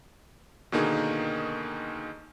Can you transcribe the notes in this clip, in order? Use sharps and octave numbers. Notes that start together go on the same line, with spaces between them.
B2 D3 D#3 A#3 D#4 G#4